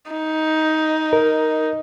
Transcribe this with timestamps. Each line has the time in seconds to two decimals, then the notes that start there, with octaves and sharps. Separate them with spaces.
0.11 D#4
1.13 A#4